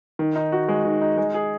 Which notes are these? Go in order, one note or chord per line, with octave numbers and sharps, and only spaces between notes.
D#3
D#4
F#4
G#3
D#3
D#4
G#3
G#4